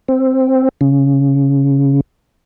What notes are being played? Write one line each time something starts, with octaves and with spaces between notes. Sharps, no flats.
C4
C#3